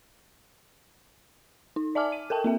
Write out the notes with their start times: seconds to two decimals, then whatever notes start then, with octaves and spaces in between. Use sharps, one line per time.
1.76 D#4
1.95 D5 E5 G#5 A5 D6 F6
2.12 D#7
2.30 A4 A#4 G5 A5
2.44 A#3 C4 E5